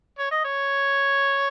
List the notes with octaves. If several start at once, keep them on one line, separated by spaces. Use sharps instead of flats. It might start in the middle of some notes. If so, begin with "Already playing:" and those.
C#5
D#5
C#5